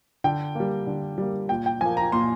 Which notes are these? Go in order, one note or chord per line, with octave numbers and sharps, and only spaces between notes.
D3 G5
G3 A#3
D3
G3 A#3
A#2 G5
G5
F3 A#3 G#5
A#5
A#2 C6